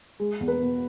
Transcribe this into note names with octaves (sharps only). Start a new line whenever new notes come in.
G#3
E2
B4
B2